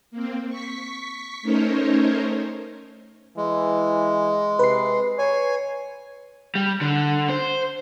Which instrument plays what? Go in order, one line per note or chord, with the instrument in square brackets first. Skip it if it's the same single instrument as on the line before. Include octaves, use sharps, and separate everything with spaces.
[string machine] A#3 C4
C#6 B6
A3 C#4 D#4 A#4 C5 C#5
[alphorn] E3 [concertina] G#3
[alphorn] C3 [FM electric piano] B4 C7
[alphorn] C#5 [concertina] G#5
[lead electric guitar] G3
D3
C5